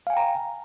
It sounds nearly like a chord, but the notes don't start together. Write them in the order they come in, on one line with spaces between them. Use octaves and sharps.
F5 G#5 G5 A#5